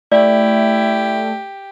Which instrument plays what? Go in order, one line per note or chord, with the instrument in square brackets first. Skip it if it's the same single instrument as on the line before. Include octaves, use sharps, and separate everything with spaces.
[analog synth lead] A3 [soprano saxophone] E4 [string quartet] G4 [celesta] D5